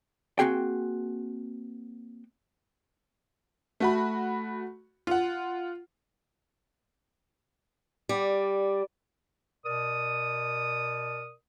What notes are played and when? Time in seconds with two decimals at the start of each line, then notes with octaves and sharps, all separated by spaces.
0.39 A#3 C4 F#4 G#4 G5
3.80 A3 F#4 B5
5.07 F4 F#5
8.09 G3 D5
9.65 B2 A#4 D5 D#6